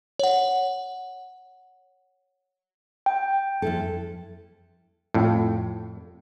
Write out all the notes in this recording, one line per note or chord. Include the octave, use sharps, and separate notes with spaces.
C#5 F#5
G5
F2 E4 A4
F2 A2